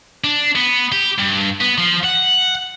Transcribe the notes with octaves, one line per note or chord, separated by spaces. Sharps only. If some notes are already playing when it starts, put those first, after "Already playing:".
D4
B3
G4
G2
B3
F3
F#5